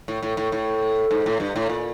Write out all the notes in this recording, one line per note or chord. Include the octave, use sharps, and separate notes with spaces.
A2
A2
A2
A2
G#2
A2
G2
A2
A#2